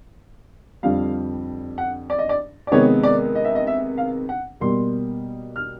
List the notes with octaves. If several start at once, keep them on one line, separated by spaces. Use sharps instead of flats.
F2 D3 G3 F5
F#5
D5
D#5
D5
D5
C3 D#3 G#3 B3 C#5
D5
D#5
E5
D#5
E5
F5
F#5
B2 G3 A#3 C6
F6